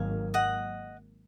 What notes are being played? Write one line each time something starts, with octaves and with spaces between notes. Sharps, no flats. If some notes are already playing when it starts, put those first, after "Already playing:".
Already playing: G#1 G#2 D#3 F#3 A#3 F5 G#5
D#5 F#5